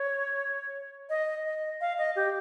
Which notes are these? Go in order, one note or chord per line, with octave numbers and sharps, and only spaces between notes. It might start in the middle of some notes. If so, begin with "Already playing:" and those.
Already playing: C#5
D#5
D#5
F5
D#5
G4